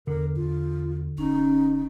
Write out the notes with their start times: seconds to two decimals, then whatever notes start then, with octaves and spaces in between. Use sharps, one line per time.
0.07 E2 D3 A#4
0.36 E2 F4
1.18 F1 C#4 D#4